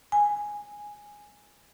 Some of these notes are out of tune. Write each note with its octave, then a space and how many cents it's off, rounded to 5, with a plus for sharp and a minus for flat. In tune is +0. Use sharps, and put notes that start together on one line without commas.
G#5 -5